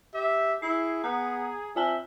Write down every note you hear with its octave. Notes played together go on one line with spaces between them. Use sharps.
G4 E5
E4 G#4 C7
B3 A#5
C4 F4 E5 G#5 A5